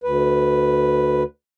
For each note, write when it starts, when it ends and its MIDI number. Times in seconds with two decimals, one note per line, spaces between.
0.04 1.23 38
0.04 1.23 71